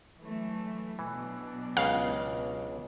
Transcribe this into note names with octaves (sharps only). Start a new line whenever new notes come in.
E3 F#3 A3
B2 E3 F#3 D4
C#2 C#3 F5